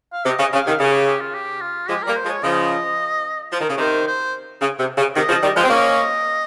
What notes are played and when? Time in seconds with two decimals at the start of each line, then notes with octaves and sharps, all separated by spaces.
0.13 F5
0.26 C3 D#5
0.39 C#3
0.53 C#3 F5
0.67 C3 D#3
0.80 C#3 C#5
0.94 G4
1.07 G4
1.21 F4
1.35 G4
1.61 F4
1.89 F3 G#3 G4
2.03 G3 A#3 A#4
2.17 C5
2.26 F3 G#3
2.31 C#5
2.43 C#3 F3 D#5
3.52 F3
3.61 D#3
3.70 C#3
3.77 C3 D#3 C5
4.07 C5
4.62 C#3
4.80 C3
4.98 C#3
5.16 C3 D#3 D#5
5.29 C#3 F3
5.35 D#5
5.43 D#3 G3
5.57 F3 G#3
5.64 C4
5.70 A#3 C#4 D#5